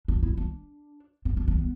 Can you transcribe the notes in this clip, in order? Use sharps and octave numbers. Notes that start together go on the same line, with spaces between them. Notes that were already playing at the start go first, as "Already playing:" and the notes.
D4
E4
D4
C4
D4
D4
B3